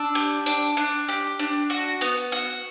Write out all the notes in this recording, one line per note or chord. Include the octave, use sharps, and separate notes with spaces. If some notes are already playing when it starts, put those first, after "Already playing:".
Already playing: D4 E6
G4
D4
D4
G4
D4
F#4
B3
F#4